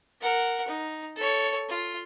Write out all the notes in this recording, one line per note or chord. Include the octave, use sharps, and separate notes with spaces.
A#4 F#5
D#4
A4 C#5
F4